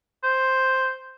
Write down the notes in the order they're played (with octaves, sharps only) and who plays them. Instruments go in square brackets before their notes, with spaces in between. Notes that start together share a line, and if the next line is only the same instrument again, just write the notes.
[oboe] C5